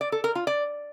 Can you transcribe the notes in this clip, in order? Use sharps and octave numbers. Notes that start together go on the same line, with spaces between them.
D5
A4
A#4
F4
D5